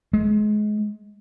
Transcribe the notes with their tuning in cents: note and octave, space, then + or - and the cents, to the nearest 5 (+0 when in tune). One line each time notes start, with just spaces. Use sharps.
G#3 +25